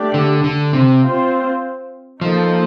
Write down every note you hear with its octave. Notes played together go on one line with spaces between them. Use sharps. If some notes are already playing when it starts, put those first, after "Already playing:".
Already playing: A3 D4 G4 D5
D3
D3
C3
C4 F4 C5
F3 A#3 D#4 A4